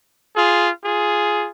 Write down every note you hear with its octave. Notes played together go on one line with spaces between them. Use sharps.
F4 G#4
F4 G#4